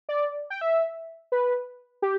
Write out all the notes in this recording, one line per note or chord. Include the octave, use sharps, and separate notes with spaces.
D5
G5
E5
B4
G4